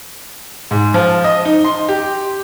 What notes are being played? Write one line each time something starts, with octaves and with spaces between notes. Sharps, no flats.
G#2
F3
D#5
D#4
C6
G4